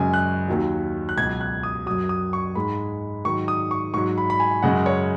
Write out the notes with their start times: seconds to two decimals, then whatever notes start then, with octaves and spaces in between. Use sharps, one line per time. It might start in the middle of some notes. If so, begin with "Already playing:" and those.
Already playing: F#2 C#3 G#3 G#5
0.14 F#6
0.48 D#2 D#3 F#3
1.09 F#6
1.17 C#2 B2 F#3 G#6
1.41 F#6
1.63 D#6
1.86 F#2 F#3 D#6
2.09 D#6
2.33 C#6
2.55 G#2 G#3 B5
3.25 G#2 D#3 F#3 C#6
3.48 D#6
3.71 C#6
3.94 G#2 F#3 C#6
4.18 B5
4.30 B5
4.40 G#5
4.63 F#2 C#3 G#3 F#5
4.86 C#5